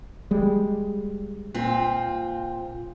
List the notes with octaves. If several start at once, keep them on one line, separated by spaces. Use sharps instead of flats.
G3 G#3
A#2 C4 F4